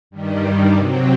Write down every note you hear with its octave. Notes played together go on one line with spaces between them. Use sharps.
G2 D#3 G3
C3 F#3 C4